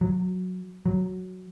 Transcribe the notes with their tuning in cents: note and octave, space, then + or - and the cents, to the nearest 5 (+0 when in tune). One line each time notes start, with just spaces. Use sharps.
F#3 -10
F#3 +0